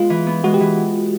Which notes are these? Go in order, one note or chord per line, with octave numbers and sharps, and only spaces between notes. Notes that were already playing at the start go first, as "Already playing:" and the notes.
Already playing: G#3 B3 F4
E3
B3
G#3 F#4
G4
E3